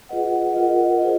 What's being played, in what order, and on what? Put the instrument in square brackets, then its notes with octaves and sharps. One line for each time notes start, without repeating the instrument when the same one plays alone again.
[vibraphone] F4 G#4 B4 D#5 F#5
F4 A#4 D#5 F#5
F4 G#4 C5